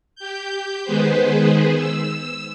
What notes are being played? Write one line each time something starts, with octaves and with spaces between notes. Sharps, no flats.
G4 G6
D#3 G#3 B3 G#4 B4 C5
E6